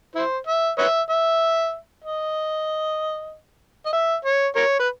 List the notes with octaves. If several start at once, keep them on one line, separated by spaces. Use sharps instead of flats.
E4 C5
E5
B4 C#5 E5
E5
D#5
D#5
E5
C#5
A#4 C#5
B4